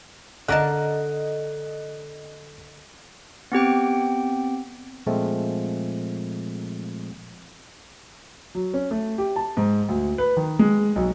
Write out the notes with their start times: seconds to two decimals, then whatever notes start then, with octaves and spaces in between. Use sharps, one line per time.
0.48 D3 A#4 D#5 A5 F#6
3.52 B3 C4 G4 G5
5.07 A#2 F3 G#3 A3 C4
8.55 F#3
8.74 C#4
8.91 A3
9.18 G4
9.36 A5
9.57 G#2
9.89 D2
10.18 B4
10.37 D#3
10.59 G#3
10.96 B1